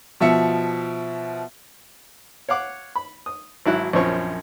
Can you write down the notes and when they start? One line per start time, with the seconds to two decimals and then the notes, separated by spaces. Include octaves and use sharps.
0.20 B2 F3 E5 C#7
2.49 C#5 F5 F#5 D6
2.96 B5
3.26 D#6
3.66 G#1 F#3 E4 E5 F#6
3.93 A#1 F#2 F3 C4 C#5 C#6